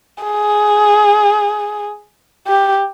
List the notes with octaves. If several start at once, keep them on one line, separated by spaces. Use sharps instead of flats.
G#4
G4